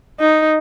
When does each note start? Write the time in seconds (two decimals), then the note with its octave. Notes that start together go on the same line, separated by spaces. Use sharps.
0.20 D#4